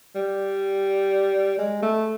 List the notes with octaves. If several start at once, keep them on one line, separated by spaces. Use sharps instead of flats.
G3
G#3
A3